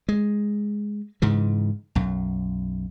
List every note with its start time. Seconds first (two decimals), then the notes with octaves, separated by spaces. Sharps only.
0.09 G#3
1.22 G#2 C#3 E3
1.95 B1 F#2